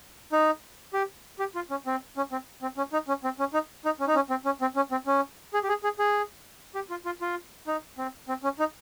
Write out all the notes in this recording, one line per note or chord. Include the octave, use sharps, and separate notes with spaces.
D#4
G4
G4
F4
C#4
C4
C#4
C4
C4
C#4
D#4
C#4
C4
C#4
D#4
D#4
C#4
D#4
C#4
C4
C#4
C4
C#4
C4
C#4
G#4
G4
G#4
G#4
G#4
G4
F4
F4
F4
D#4
C4
C4
C#4
D#4